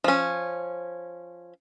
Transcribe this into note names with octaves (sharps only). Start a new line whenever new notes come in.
F3 C#4